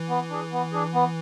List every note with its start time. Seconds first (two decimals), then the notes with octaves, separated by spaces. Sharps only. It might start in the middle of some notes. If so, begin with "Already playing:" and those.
Already playing: E3
0.09 B3
0.30 D4 G#4
0.52 B3
0.72 D4 G#4
0.94 B3